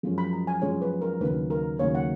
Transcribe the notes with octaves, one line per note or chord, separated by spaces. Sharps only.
F#2 F3 G#3 C#4
B5
A#5
G#5
F#2 F3 G#3 C#4 C#5
B4
A#4
D#2 C#3 F#3 A#3 B4
A#4
D#2 C#3 F#3 A#3 C#5
F#5